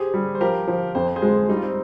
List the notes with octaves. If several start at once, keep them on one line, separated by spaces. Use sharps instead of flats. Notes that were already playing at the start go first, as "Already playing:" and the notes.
Already playing: G4 G#4 C5
G3
C5
F3 G4 A#4
F3
F2 C5
G#4 C5
G#3
G3 D#4
F4
C4 D#4